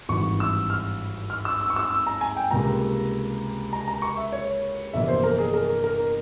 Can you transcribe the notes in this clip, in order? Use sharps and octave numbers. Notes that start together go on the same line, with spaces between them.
G#1 G2 E3 C#6
E6
F6
F6
E6
E6
C#6
E6
E6
A#5
G#5
G5
C#2 C3 G3 A#3 A#5
A#5
A#5
C#6
E5
C#5
G1 F2 C3 E3 A#3 E5
C5
A#4
G#4
A#4
A#4